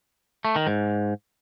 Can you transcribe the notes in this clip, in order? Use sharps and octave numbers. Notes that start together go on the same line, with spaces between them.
A3
D#3
G#2